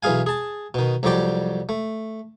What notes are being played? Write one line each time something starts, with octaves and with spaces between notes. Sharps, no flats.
B1 E3 G#4 F5 G#5
G#4 A5
B2 D#3
C2 F2 F#3 G3 D5 G5
A3